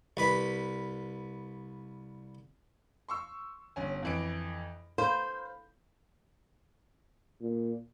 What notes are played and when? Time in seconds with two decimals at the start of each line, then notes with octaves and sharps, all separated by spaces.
0.17 C2 B4 B5
3.08 C6 C#6 E6
3.76 G1 C#4 G#5
4.03 F2 E3 D7
4.98 C5 F5 B5 G6
7.41 A#2